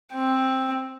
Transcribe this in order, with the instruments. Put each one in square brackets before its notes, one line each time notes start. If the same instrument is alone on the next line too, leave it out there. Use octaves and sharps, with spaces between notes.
[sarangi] C4